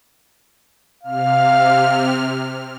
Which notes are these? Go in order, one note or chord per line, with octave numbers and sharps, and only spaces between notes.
C3 F5 F6